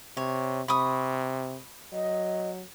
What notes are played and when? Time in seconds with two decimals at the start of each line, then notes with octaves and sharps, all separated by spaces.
0.17 C3 C#5
0.68 C3 B5 C#6 D#6
1.92 F#3 D#5